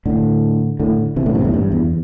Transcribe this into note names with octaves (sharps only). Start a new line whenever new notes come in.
A2 D3
A2 D3
C3 E3
A2 D3
G2 C3
E2 A2
G2
E2